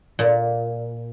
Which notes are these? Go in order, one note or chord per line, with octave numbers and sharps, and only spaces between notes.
A#2